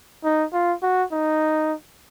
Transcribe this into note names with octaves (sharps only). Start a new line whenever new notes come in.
D#4
F4
F#4
D#4